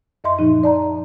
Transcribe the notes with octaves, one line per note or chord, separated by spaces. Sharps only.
F#2 D#5 E5 C6
A#2 F3 D#4
D5 A5 A#5